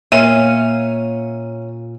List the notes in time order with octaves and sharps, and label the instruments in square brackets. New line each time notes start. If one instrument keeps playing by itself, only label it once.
[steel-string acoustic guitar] A#2 [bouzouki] C#4 F5 [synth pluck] E5 [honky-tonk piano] D#7